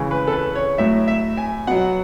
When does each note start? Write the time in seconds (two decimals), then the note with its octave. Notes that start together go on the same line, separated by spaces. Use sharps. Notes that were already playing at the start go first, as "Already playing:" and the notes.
Already playing: C#3 E3 G#3
0.11 B4
0.27 A4
0.32 B4
0.55 C#5
0.78 A2 F#3 E5
1.08 E5
1.37 G#5
1.67 B2 F#3 F#5